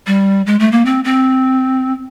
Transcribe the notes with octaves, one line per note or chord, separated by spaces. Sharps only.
G3
G#3
A3
A#3
C4
C4